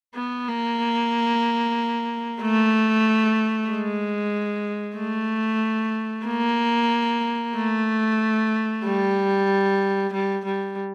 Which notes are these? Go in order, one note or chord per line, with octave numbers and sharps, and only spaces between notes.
B3
A#3
A3
G#3
A3
A#3
A3
G3
G3
G3